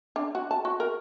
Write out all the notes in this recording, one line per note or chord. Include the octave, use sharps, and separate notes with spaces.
D4
F#4
A5
F#4
A#4